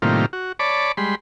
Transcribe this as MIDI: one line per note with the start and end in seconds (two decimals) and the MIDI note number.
0.02 0.26 45
0.02 0.26 48
0.02 0.26 51
0.02 0.26 55
0.02 0.26 58
0.02 0.26 65
0.33 0.52 66
0.59 0.92 73
0.59 0.92 74
0.59 0.92 81
0.59 0.92 83
0.59 0.92 86
0.97 1.15 55
0.97 1.15 56
0.97 1.15 83
0.97 1.15 84